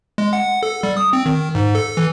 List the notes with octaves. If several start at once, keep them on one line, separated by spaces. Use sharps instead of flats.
G#3
F#5
A4
G3
D#6
C4
D#3
G#2
A4
E3